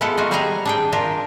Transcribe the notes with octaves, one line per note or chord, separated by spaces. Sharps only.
G#3 B3 E4 F4 A4 F#5
D#4 F4 F#4
G3 G#4 C5 F#5 G#5 A#5
D4 G#4 G5
D4 F4 A#4